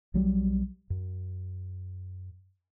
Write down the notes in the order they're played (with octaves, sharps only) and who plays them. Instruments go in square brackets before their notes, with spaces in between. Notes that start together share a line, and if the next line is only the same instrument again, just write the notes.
[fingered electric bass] B1 F#3 G3
F#2